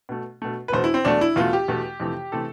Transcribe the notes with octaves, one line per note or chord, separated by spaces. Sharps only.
B2 A3
B2 A3
B4
E2 B2 A3 C5
E4
C4
E2 B2 A3 D4
E4
E2 B2 A3 F4
G4
E2 B2 A3
F2 C3 E3 A3
C3 E3 A3 A4